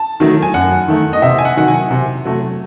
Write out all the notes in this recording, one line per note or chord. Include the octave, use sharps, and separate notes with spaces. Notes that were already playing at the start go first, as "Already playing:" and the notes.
Already playing: A5
D#3 F#3 A3
G#5
F#2 F#5
D#3 A3
D#5
C3 E5
G#5
F#5
D#3 F#3 F#5
G#5
C3
F#3 A3